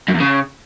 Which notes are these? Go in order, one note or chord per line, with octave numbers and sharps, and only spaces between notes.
F#2
E2
C#3